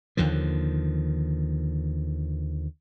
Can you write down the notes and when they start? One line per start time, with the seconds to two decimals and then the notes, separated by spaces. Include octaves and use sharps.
0.17 D#2 D3 D#3 F3